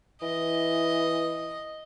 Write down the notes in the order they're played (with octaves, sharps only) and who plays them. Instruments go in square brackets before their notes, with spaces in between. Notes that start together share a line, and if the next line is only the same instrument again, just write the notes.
[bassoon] E3 [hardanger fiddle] D#5